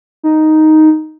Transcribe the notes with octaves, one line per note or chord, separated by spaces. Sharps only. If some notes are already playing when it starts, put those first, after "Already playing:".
D#4